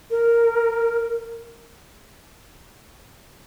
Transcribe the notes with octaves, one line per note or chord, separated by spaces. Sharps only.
A#4